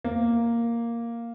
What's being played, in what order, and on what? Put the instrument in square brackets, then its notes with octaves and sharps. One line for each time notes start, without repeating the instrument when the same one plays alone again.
[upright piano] A#3